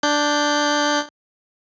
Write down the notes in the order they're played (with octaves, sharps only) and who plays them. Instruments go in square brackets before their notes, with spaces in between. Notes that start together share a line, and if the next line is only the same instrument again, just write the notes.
[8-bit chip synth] D4 G6